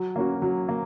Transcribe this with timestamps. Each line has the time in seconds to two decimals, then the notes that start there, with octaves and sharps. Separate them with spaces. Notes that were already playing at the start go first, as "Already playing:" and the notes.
Already playing: F#3
0.16 A#3 C#4 F#4
0.42 F#3
0.68 A#3